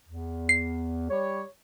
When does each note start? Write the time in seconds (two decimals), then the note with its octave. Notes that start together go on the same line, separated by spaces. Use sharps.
0.07 E2
0.49 C7
1.09 G3 G4 C#5